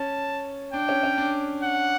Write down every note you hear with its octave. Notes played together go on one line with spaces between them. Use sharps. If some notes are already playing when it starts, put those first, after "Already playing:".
Already playing: C#4 A5
D4 G5
C#4
C#4
D4
F#5